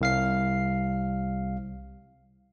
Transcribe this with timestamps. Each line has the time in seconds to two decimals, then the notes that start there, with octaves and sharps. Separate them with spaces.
0.01 C2 F5 C7